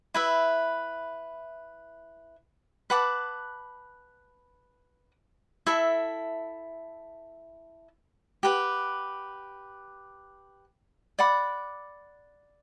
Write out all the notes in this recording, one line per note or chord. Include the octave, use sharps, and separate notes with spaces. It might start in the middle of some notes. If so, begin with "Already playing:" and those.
E4 B4 E5
B4 F#5 A5 D6
E4 A4 E5
G4 B4 F#5
D5 F#5 B5 D6